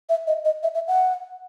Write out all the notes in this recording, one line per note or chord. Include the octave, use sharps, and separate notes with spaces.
E5
D#5
D#5
E5
E5
F#5